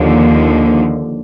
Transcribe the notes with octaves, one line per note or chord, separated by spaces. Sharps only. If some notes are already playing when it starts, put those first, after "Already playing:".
Already playing: D#2 D3 F3